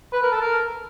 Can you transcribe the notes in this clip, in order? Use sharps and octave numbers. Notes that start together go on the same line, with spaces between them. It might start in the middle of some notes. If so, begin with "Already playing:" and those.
B4
A#4
A4
A#4